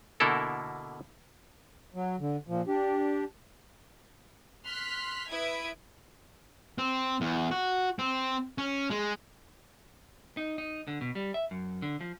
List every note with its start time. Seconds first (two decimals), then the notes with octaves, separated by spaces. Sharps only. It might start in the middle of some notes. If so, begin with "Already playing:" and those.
0.20 B2 D3 A#3 E4 A4 A#4
1.94 F#3
2.20 D3
2.48 A#2 F3
2.68 D4 G4
4.66 C6 F6 F#6 B6
5.29 E4 B4 E5 D#6 G#6 D7
6.78 C4
7.21 E2
7.51 F#4
7.99 C4
8.58 C#4
8.90 G#3
10.37 D#4
10.58 D#4
10.87 D3
11.01 B2
11.15 G3
11.34 E5
11.51 F#2
11.82 D3
12.01 F3